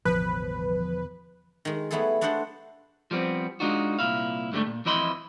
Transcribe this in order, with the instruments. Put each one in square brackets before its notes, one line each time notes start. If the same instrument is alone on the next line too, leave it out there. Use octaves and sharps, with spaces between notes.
[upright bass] A1 G3 [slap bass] E2 B2 D3 [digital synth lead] F3 [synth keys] B4
[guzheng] D#3 G#3
G3 A3 B3 E4 G#4 A4
B3 D4 F#4 A4 C5 F#5
[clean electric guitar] F3 G3 B3 C4
G#3 D4 D#4 F4 F#4
C2 A#2 E4 F5
G#2 D3 F#3 G3 A3
A#2
F2 E3 E4 D#5 B5 C6